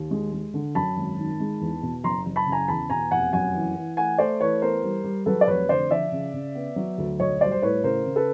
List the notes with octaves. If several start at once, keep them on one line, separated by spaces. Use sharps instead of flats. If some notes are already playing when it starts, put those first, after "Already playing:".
Already playing: D#2
G#3
G#3
D3
F#2 A5 B5
G#1
D#3
G#3
E2
B2
F#1 A#5 C6
F#1
A5 B5
C#3
G#5 A#5
E2 A5 B5
B2 G#5 A#5
F1 F#5 G#5
F#2 F#5 G#5
E3
E3
A3 F#5 G#5
A3 C5 D5
E3 B4 C#5
B3 A#4 C5
G3
G3
F#3 A4 B4
D5
F1 B4 C#5
D3 C5 D5
F3 D5 E5
C#3
C#3
B3
F#3
D2
B1 C#5 D#5
G3 C5 D5
C5
A2 B4 C#5
C#3 A#4 C5
C#3
A4 B4